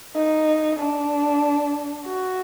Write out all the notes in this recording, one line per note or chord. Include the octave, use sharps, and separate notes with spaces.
D#4
D4
F#4